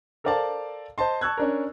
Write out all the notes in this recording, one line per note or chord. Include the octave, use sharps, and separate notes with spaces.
A4 A#4 C5 D5 F5 A5
C5 D#5 A5 C6
A5 C#6 E6 F#6 G#6
C#4 D4 A#4